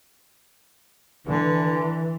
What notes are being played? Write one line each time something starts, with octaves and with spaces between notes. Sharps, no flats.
D3 E3